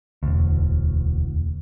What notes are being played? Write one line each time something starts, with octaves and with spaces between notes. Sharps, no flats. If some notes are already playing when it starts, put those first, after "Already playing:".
E1 D2